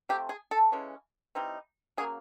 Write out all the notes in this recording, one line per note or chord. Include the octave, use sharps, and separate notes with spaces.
C3 F3 A3 C4 G4
G#4
A4
C#3 E3 G#3 C#4
E3 G3 C4 D#4
C#3 F#3 A#3 G#4